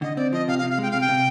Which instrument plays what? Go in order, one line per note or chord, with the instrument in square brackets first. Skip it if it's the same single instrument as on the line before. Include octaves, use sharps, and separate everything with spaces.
[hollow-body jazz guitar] D3 [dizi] D#5
[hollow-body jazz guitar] C4 [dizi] D5
[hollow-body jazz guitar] F3 [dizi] D#5
[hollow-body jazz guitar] C3 [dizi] F5
[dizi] F5
[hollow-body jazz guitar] C3
[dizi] F5
[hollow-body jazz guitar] G#3 [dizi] G5
[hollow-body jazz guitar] C3 [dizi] F5
[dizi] G5
[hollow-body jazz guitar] C3